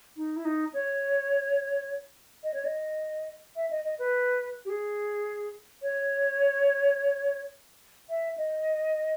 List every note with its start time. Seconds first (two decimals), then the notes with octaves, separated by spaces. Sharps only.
0.17 D#4
0.36 E4
0.45 D#4
0.74 C#5
2.44 D#5
2.54 C#5
2.65 D#5
3.56 E5
3.71 D#5
3.85 D#5
3.99 B4
4.65 G4
4.69 G#4
5.82 C#5
8.09 E5
8.38 D#5